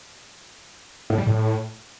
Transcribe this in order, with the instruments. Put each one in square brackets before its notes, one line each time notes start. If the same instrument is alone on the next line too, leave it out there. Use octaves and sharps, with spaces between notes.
[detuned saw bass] A2
G3
A2